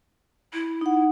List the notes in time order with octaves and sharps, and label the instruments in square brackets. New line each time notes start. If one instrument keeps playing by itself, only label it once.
[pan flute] E4
[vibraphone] D#4 F#5